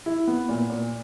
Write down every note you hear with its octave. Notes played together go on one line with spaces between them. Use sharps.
E4
B3
A#2
A#2